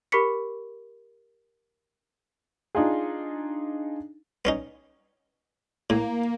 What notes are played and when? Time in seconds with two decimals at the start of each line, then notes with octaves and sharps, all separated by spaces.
0.12 G4 A#4 B5 C#6 B6 C#7
2.75 D4 D#4 F4 G#4
4.45 B3 C#4 D#4
5.90 A2 A#3